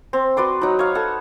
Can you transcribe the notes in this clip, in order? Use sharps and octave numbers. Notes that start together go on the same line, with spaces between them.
C4
F#4 B4 D5 C6
F#3 D#4
C#5 F5
A4 F#5